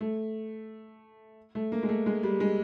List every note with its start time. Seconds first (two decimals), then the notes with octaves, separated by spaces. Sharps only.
0.01 A3
1.55 A3
1.72 A#3
1.83 G#3
1.89 A3
2.06 G#3
2.23 G3
2.40 G#3